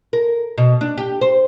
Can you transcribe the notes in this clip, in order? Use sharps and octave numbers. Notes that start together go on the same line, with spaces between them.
A#4
B2
D4
G4
C5